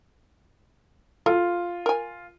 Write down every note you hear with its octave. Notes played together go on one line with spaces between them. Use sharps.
F4 A4
A#4 G#5